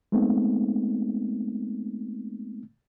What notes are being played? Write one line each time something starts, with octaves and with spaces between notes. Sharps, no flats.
G#3 A3 B3 C4 D#4